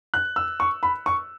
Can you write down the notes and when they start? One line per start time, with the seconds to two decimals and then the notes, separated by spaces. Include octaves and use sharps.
0.14 F#6
0.36 E6
0.60 C#6
0.83 B5
1.06 C#6